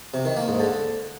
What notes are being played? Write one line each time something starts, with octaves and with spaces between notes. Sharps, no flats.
C3
D#3
A#3
G#2
D3